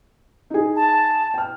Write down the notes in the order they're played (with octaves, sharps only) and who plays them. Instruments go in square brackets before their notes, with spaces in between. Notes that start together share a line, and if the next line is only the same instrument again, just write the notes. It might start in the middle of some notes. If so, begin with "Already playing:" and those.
[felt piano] D#4 G#4
[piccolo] A5
[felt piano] G5 F6